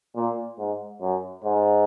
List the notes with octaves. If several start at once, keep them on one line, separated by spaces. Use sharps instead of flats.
A#2
G#2
F#2
G#2